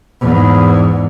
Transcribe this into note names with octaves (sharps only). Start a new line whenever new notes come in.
E2 G#2